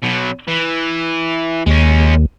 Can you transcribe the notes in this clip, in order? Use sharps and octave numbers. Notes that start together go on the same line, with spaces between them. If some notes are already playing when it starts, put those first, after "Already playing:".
B2 F#3
E3
D#2 G#3 C#4